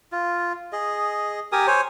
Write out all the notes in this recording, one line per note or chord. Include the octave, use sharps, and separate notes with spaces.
F4
G#4 D#5
G4 A#4 G#5 D#6
C5 C#5 G#5